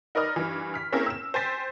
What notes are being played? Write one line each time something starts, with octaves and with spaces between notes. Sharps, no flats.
D#4 A#4 B4 D5 D#5 F6
G2 E3
F6 B6
A#3 C4 C#4 E4 G#4 A#4
E6 E7
C5 G5 G#5 C6 A6 B6